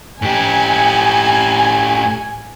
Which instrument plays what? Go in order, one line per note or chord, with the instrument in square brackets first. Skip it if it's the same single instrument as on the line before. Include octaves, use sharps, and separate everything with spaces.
[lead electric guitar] A2 G4 [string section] G#5